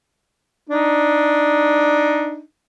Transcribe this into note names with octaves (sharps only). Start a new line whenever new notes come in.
D4 D#4